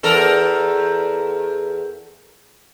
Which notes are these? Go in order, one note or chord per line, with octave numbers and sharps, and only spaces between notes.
E2 A4 A#4